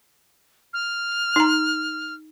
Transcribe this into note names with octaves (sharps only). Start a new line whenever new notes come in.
F6
D#4 A#5